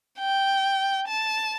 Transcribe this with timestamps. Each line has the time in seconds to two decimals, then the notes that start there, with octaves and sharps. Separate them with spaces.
0.20 G5
1.08 A5